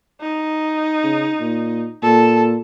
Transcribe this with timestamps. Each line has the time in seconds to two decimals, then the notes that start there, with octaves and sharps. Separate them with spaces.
0.21 D#4
1.04 C#3
1.40 A#2
2.03 A#2 A4